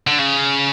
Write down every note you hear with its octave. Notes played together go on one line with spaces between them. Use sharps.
D3
C#3